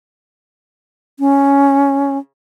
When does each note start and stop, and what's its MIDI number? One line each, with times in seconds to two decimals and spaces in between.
1.20 2.18 61